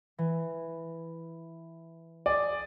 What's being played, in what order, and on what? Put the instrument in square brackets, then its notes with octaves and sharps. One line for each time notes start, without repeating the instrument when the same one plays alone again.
[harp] E3
[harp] G#4 G#5 [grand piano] D5